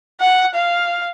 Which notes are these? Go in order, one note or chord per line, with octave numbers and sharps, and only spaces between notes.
F#5
F5